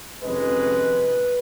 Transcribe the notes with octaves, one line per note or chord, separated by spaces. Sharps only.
F2 C3 D#3 G#3 C#4 B4